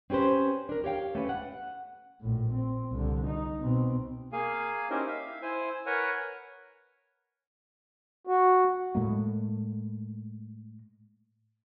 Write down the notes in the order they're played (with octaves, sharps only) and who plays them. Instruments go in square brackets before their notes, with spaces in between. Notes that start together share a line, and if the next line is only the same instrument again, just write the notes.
[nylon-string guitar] C4 C#4 G4 B4 C5
D4 A#4
G4 C#5 F5 G5
A3 C#4 B4
F#5
[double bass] A#1 A2
C4
C2 D3
D#4
B2 C4
[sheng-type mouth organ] A#3 G#4 F5 G#5
C#4 D#4 E4 G4 A#4 C5
E5 F5
E4 C5 G#5
A#4 B4 C#5 F#5 G#5
[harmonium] F#4
[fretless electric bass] A2 G#3 A#3